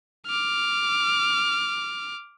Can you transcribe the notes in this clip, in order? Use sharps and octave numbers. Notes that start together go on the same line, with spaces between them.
D6 F6